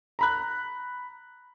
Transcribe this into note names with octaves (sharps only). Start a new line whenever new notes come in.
A#5 B5 F#6